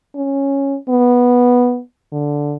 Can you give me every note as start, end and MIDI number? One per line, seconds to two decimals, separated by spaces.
0.16 0.77 61
0.89 1.80 59
2.12 2.56 50